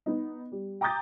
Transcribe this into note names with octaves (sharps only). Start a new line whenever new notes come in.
B3 D#4
G3
G5 A#5 D6 D#6 G6 A6